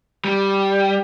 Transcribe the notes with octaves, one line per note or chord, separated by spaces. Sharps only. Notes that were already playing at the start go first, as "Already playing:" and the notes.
G3